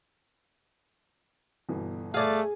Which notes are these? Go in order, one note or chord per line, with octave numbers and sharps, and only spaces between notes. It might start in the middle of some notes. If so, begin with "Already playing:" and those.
G1 B2 E3
A3 G#4 D5 F5